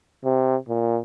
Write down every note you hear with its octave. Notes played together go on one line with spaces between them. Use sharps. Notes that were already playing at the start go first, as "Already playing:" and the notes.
C3
A#2